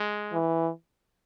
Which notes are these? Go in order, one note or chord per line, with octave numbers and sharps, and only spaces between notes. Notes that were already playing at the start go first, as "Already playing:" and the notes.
Already playing: G#3
E3